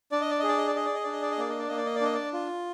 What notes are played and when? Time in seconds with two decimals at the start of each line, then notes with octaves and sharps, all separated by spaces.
0.12 D4 D5
0.21 D#5
0.30 D5
0.39 G#4 D#5
0.48 D5
0.57 D#5
0.67 D5
0.75 G#4 D#5
0.85 D5
0.94 D#5
1.04 D4 D5
1.12 D#5
1.22 D5
1.31 D#5
1.38 A#3 D5
1.50 D#5
1.59 D5
1.68 A#3 D#5
1.77 D5
1.86 D#5
1.95 D5
2.01 D4 D#5
2.14 D5
2.33 F4